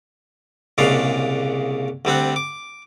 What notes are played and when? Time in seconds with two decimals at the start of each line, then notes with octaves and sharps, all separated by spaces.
0.78 C2 A#2 C#3 G#3 D4 F5
2.05 D2 G3 C4 F#5
2.36 D6